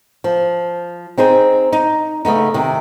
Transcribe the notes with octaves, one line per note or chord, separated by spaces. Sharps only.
F3
C4 D#4 G#4 C5
D#4
C#3 A3 B3 D#4
C3 D#3